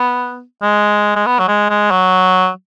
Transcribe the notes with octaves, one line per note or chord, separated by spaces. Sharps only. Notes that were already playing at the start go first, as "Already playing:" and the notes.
Already playing: B3
G#3
G#3
B3
F#3
G#3
G#3
F#3